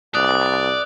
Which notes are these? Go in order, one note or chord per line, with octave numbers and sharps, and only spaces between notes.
C2 D5 D#6 F#6